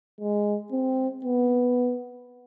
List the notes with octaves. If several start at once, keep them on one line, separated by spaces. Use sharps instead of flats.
G#3
C4
B3